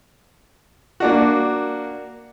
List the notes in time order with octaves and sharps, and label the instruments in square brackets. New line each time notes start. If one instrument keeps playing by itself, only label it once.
[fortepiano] A#3 D4 F#4